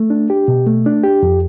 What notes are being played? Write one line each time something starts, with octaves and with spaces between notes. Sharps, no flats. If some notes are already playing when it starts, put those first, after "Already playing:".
Already playing: A3
D4
G4
B2
A3
D4
G4
F2